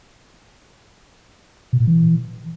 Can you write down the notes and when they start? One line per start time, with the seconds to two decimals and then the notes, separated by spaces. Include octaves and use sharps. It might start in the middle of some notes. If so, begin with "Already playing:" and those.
1.73 B2
1.80 A#2
1.87 E3